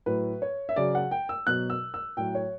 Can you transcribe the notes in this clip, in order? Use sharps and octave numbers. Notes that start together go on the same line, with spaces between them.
A2 F#3 B4
C#5
E5
C#3 F#3 D5
F#5
G5
E6
B2 F#3 F#6
E6
E6
A2 F#3 G5
C#5